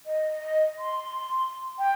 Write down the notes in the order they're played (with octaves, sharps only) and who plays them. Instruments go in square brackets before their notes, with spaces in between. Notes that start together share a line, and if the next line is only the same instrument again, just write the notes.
[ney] D#5
C6
G5